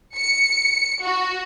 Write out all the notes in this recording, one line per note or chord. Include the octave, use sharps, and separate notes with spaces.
C#7
F#4